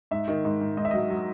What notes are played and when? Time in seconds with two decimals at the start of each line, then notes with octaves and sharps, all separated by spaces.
0.11 G#2 E5
0.28 D#3
0.45 G#2
0.61 G#2
0.77 G#2 D#5
0.85 E5
0.91 F#3 D#5
1.10 F#3